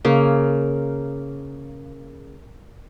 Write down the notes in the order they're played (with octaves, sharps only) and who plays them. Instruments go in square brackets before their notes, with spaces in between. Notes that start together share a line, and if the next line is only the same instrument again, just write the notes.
[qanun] C#3 A#3